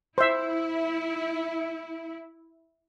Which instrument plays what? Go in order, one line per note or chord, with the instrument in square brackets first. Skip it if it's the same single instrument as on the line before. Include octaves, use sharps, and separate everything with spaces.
[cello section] E4 [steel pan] C5 E5